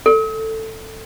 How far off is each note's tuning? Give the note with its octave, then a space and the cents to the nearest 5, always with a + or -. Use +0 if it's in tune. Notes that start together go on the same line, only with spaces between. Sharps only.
A4 +10